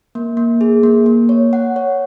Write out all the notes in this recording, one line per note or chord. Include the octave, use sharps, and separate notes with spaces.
A#3
A#3
G#4
A#3
A#3
C#5
F#5
C#5